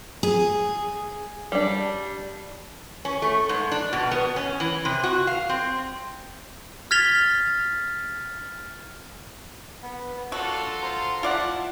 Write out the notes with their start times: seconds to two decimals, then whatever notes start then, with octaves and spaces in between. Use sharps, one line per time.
0.23 G#4
1.52 G3 D4
3.05 C#4
3.22 A3
3.49 G#2
3.72 D4
3.93 B2
4.11 B3
4.36 C#4
4.60 E3
4.85 C3
5.03 F#4
5.27 F5
5.49 C4
6.91 F6 G#6 A6 B6 F7 G7
9.82 B3
10.32 D4 F4 F#4 A4 E6
10.83 C5 A#5 C6
11.23 E4 F4 D5 F#5 A5